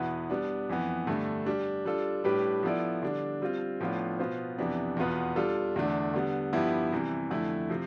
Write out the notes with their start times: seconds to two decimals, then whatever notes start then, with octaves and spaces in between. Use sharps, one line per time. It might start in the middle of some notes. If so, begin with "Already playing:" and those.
Already playing: E2 B2 B3 E4 B4
0.30 G3 B3 D4
0.69 F2 E3 B3
1.07 G2 D3 A3
1.46 G3 D4 G4
1.85 G3 D4 F4 A4
2.24 A2 G3 D4 G4 B4
2.63 F3 B3 E4 A4 D5
3.03 D3 G3 D4
3.42 G3 C4 F4
3.80 A2 F3 B3 D4 F4
4.19 B2 B3 F4 C5
4.58 F2 C3 E3 B3 D4
4.97 E2 B2 B3 F4 B4
5.36 G3 D4 F4 A4
5.76 E2 D3 A3 D4
6.14 D3 G3 B3
6.53 G2 F3 B3 E4 G4
6.92 C3 E3 G3
7.30 F2 D3 A3 E4
7.70 C3 F3 C4